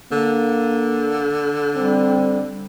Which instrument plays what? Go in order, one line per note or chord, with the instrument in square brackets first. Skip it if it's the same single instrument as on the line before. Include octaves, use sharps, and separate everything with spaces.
[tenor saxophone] D3 [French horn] A#3
[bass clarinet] G3 [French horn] C4